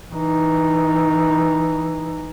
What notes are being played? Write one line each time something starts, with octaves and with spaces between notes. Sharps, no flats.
E3 D#4